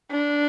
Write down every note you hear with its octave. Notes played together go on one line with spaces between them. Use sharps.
D4